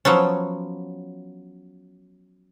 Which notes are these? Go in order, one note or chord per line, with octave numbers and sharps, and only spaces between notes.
F3 F#3 B3 C#4